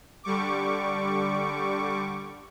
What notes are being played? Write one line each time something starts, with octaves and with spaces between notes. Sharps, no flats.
D3 G3 C#6 D6